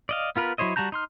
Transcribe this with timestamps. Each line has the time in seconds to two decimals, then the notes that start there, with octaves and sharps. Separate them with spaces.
0.09 D5 D#5 F5
0.36 B3 F4 A#4 B4
0.58 F#3 E4 C5 C#5 D#5
0.76 G3 F#4 A5 A#5 G6
0.92 D#4 C6 F6